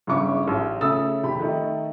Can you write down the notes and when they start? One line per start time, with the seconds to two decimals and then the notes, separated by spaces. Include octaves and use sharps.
0.07 G1 C#3 E4 C#6 D6
0.47 A1
0.81 C#3 A3 D#6 E6 A6
1.22 F1 D#3 G4 B5
1.39 D#3 A3 D#4